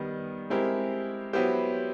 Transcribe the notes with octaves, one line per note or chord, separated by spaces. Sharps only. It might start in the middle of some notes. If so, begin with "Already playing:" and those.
Already playing: D#3 G3 B3
G#3 C4 E4 G4 A#4
F#3 B3 E4 G4 C5